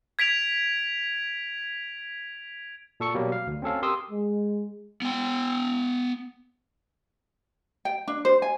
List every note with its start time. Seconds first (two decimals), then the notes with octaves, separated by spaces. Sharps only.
0.19 G#6 B6 D7 F7
3.00 A#2 A4 C#6 C#7
3.14 B2 F#3 G3 A#3
3.32 F5
3.47 D2
3.62 C4 C#4 A4 F5
3.82 G4 A#4 C6 D#6 E6
4.11 G#3
5.02 B3 G5
7.85 G5
8.08 D4
8.25 C5
8.42 G#5